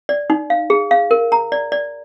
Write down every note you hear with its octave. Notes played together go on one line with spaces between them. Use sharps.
D5
D#4
F5
G#4
F5
A#4
A#5
D5
D5